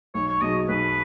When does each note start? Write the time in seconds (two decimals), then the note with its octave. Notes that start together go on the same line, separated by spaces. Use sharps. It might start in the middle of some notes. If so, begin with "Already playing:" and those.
0.14 B1 C#5
0.28 C#5
0.41 B2 F#3 D#4 G#4 D#5
0.68 B1 B4